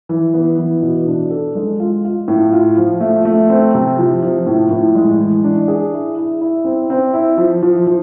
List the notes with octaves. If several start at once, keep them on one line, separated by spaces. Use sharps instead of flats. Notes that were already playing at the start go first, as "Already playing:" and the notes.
E3
B3
E3
B2
D4
A4
G#3
F4
F4
A2
F4
F3
A3
A3
C4
C3
F3
F3
A2
A2
G#3
E3
D4
G#4
E4
E4
E4
C4
C4
E4
F3
F3
F3